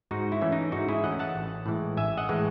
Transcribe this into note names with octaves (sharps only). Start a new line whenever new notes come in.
G#2 D#4 F#4
E4
E3 A3 C#4
D#4
G#2 D#4 F#4
E4 G#4
E3 A3 C#4 D#5 F#5
F#5 A5
A1
A2 E3 G#3
A1 E5 G#5
D#5 F#5
A2 E3 G#3